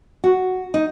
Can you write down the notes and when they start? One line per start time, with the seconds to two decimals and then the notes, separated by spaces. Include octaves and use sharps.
0.24 F#4
0.74 D#4